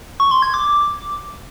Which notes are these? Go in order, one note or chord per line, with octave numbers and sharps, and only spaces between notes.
C#6
C6
G#6
D6